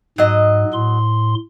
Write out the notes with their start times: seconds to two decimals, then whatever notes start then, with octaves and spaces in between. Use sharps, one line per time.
0.18 G#2 F#3 D#5
0.73 A2 C6